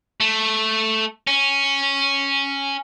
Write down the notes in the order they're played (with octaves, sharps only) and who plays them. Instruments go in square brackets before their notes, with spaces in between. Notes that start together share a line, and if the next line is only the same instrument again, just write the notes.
[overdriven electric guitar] A3
C#4